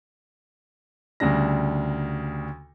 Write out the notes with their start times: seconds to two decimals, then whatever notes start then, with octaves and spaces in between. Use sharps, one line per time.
1.20 D2 C#3 G3 D4 A#6